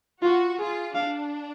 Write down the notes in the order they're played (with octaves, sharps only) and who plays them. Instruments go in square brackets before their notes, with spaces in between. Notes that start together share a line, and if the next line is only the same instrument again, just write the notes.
[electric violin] F4 [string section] F#4
[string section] F4 [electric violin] G#4
[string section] D4 [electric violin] F5